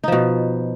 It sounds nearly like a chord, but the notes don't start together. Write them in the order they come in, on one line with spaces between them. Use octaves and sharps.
D#4 F3 B2